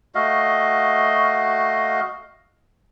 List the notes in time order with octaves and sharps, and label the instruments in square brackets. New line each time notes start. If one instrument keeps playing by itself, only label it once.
[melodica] A3 F#4 D#5 F5